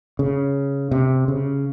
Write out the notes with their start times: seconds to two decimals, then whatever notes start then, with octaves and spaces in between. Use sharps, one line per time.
0.19 C#3
0.91 C3
1.28 C#3